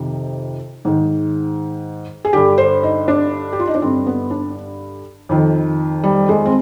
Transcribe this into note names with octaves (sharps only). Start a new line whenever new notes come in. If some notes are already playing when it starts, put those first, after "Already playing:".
Already playing: F2 C3 D#3
G#2 D#3
G#4
G2 D3 G4
C5
D#4
D4
G4
F4
D#4
D4
G2 D3 C4
B3
D4
F2 D#3
G3
G#3
C4